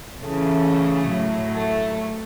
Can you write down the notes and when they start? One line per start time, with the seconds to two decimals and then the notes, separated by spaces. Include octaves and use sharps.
0.20 C#3 E3 A3
1.09 A2 F#3
1.53 A3